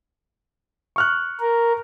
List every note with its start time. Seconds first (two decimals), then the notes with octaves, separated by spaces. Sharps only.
0.96 C#6 F6 F#6
1.40 A#4